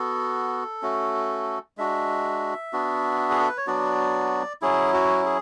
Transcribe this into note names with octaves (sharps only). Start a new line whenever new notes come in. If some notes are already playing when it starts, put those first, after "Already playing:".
Already playing: B3 F#4 A4
A3 C#4 F#4
G#3 D4 F#4 E5
B3 D4 F#4
G#4
A4
B4
C#5
F#3 B3 D4 F#4 D5
F#3 C#4 E4 G#4
F#4
G#4